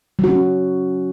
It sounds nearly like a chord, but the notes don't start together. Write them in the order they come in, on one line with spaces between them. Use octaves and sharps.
F#3 F#4 C#4